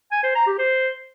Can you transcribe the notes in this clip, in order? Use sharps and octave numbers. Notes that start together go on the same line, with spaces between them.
G#5
C5
A#5
G4
C5